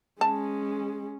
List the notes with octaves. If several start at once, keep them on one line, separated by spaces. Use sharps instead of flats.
G#3 C#4 A5